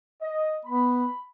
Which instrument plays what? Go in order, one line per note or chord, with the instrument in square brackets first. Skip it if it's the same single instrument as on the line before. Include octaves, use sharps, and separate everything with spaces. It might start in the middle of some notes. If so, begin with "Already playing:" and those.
[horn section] D#5
[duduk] B3 [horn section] B5